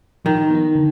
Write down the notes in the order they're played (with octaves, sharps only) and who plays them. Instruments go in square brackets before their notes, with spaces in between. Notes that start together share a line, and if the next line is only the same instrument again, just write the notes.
[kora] D#3 [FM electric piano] F3
[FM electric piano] B3 D#4
D3